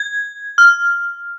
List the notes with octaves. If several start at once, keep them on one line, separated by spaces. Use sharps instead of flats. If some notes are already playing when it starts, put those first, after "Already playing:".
Already playing: G#6
F6